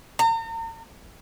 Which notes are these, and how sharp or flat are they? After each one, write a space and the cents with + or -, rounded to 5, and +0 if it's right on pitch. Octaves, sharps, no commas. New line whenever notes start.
A#5 -40